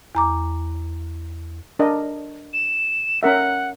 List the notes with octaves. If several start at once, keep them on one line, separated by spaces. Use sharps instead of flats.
E2 A#5 D6
D4 A#4 D#5
E7
C#4 A#4 E5 F#5